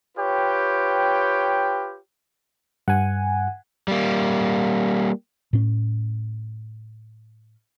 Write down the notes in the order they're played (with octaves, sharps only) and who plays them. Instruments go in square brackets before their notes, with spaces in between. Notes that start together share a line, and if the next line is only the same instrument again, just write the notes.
[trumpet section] F4 G4 B4 C#5 G5
[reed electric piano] G2 [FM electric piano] F#5 G#5
[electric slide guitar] G3 A#3
[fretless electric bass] A2 C#4